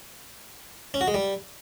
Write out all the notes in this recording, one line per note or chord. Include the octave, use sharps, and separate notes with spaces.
C#4
F#4
G#3
G3